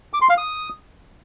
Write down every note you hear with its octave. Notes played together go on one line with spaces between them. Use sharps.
D6
C6
F5
D#6